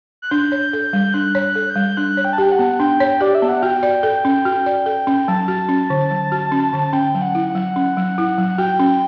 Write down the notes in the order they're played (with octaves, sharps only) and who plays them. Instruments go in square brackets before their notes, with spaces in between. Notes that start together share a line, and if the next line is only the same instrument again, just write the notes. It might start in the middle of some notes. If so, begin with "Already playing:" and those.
[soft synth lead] F#6
[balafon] D4 [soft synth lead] G6
[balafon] C#5
A4
G3
[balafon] D4 [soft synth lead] F#6
[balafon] C#5
[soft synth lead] F#6
[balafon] A4
[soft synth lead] G6
[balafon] G3
[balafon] D4 [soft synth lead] F#6
[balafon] C#5
[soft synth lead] G5
A5
[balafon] G4 [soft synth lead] G5
[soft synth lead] F#5
[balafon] B3
[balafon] D4 [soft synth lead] G5
[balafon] C#5
[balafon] G4 [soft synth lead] D5
[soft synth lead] E5
[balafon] B3
[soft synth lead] F#5
[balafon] F#4 [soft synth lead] G5
[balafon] D5
A4
C#4
F#4
D5
A4
C#4
[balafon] F#3 [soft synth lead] A5
[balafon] F#4
C#4
D3
F#3
F#4
C#4
D3
[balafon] C#4 [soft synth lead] G5
[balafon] F#3
[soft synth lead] F#5
[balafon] E4
[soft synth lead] F#5
[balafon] F#3
C#4
F#3
E4
F#3
[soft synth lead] F#5
[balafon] F#4 [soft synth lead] G5
[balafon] C#4